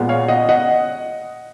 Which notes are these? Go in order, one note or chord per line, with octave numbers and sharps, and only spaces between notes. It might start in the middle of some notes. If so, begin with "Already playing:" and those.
Already playing: A#2 G#3 B3
C#5 F5
D#5 F#5
D#5 F#5